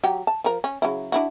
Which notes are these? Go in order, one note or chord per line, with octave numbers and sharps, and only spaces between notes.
F#3 G4
A5
F3 A#4
C#4
C#3 F#3 E4
D4 E4 F#4